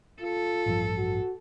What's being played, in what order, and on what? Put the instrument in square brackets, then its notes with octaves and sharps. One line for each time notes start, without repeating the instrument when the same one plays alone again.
[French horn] F4 [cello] A4
[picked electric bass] A1 G2 F3
[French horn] F#4